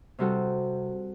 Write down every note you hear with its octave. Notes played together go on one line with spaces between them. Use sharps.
C3 G3 C4 F#4 A4